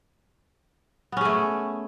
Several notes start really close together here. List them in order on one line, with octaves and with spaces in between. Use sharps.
B3 C#4 G#4 A3